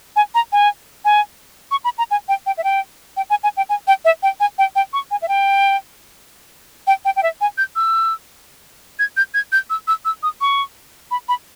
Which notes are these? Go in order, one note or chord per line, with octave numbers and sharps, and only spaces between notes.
G#5
A#5
G#5
G#5
C#6
B5
A#5
G#5
G5
G5
E5
G5
G5
G#5
G#5
G5
G#5
G5
E5
G5
G#5
G5
G5
C#6
G#5
E5
G5
G5
G5
G5
E5
G#5
G6
E6
G#6
G6
G#6
G6
E6
E6
E6
D#6
C#6
B5
B5